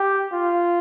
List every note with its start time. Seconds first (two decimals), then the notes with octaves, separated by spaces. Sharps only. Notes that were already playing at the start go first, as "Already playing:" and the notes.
Already playing: G4
0.33 F4